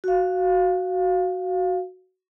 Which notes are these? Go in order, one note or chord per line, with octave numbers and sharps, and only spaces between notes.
F#4 F5